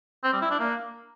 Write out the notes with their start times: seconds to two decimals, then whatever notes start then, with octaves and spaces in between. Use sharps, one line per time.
0.24 C4
0.33 G3
0.42 E4
0.51 D4
0.60 A#3